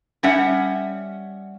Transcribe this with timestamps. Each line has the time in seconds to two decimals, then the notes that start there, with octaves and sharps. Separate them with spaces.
0.23 G3 C#4 E5 F#5